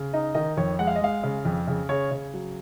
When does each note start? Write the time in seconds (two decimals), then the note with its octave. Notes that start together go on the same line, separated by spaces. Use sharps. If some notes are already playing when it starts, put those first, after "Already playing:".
Already playing: C#3
0.13 D#4 D#5
0.35 D#3 D#5
0.57 F2 C#5
0.79 G#3 F#5
0.87 F5
0.96 D#5
1.01 G#3 F5
1.23 C#3
1.45 F2
1.67 C#3
1.89 C#3 C#5
2.11 C#3
2.34 F#3